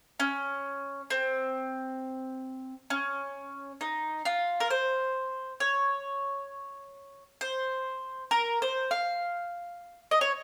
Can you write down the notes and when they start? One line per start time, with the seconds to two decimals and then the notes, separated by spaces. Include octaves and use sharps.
0.20 C#4
1.10 C4
2.90 C#4
3.81 D#4
4.25 F4
4.60 A#4
4.70 C5
5.60 C#5
7.41 C5
8.31 A#4
8.62 C5
8.91 F5
10.11 D#5
10.21 C#5